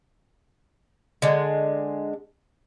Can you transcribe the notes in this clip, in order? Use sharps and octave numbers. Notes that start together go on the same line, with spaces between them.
D3 G#3